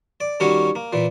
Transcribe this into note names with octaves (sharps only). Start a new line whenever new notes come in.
D5
D#3 G3 C#4 F#4 C#5
A#3
A#2 E3